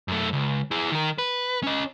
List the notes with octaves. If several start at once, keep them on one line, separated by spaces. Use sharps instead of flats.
F#2 A3
C#2
E4 G#4
D#3 A#4
B4
C#4 D#5